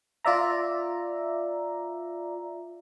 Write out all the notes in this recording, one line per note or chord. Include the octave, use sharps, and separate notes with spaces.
F4 D5 E5 A#5